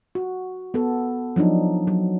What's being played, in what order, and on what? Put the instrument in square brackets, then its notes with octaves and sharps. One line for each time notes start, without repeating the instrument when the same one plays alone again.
[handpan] F#4
B3 A4
F3 F#3 D4 D#4
F#3